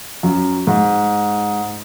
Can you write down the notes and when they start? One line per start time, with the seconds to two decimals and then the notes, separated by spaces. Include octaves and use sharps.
0.23 F#2
0.67 G#2